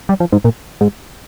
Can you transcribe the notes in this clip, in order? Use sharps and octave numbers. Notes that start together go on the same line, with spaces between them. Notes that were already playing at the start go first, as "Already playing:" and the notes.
G3
F3
G#2
A#2
G#2